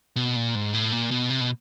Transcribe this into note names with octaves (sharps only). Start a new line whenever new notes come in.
B2
A#2
G#2
A2
A#2
B2
C3
B2